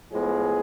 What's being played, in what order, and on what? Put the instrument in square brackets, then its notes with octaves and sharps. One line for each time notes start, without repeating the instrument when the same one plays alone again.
[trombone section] A2 F3 G#3 B3 G#4